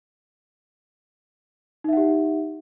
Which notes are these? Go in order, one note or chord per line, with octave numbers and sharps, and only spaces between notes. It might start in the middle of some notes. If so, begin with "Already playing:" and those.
D#4 G4 E5 F#5